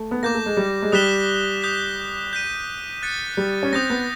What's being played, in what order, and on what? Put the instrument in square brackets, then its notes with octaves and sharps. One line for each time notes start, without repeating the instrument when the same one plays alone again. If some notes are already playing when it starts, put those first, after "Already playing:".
Already playing: [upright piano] A3
B3
[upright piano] A#3 [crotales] D6 G6 A#6
[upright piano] A3
G#3
G3
G#3
[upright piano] G3 [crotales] D#6 F#6 B6 E7 G7
[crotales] D#6 G6 B6
G6 B6 D#7
F#6 A6 C#7
[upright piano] G3
C#4
[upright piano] C4 [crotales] D#6 G6 A#6
[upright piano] B3